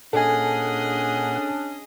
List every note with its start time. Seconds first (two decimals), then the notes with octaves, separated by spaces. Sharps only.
0.13 A#2 C#4 D4 G#4 A4 D#5 F#5 G#5